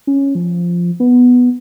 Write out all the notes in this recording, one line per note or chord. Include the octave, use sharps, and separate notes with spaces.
C#4
F3
B3